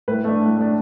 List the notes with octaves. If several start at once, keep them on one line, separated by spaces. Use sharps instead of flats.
A2 B4
A3 D4
A2
A3 D4